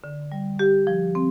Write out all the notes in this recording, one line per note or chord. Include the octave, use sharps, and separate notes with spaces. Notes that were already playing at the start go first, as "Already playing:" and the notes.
D3
G3
G4
F3
C4